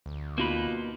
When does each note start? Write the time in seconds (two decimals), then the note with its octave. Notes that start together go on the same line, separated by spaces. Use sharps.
0.06 D2
0.38 B2 A#3 D#4 F4 B4